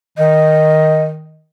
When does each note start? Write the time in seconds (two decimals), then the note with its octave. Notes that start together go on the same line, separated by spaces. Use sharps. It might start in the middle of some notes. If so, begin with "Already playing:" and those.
0.18 D#3 D#5